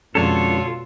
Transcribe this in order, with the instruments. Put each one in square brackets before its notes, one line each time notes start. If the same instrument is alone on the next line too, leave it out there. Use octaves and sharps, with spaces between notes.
[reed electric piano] F2 G#3 C#4 [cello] B2 F4 [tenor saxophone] D3 [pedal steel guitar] A4 C#5